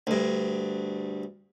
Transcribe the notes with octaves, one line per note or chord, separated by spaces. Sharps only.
D2 G2